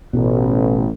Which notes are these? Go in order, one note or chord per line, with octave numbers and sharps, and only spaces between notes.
A1 B2